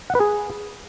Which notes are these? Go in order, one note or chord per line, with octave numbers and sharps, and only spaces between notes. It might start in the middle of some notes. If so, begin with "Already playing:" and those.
F#5
B4
G#4